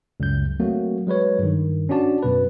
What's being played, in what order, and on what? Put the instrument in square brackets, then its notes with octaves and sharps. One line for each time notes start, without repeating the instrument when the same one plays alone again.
[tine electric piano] C#2 F#2 G6
F#3 A3 A#3 C4 F#4
F#3 G#3 B4 C#5
G2 D#3
C#4 D4 F#4 D5 A5
F#2 B2 B4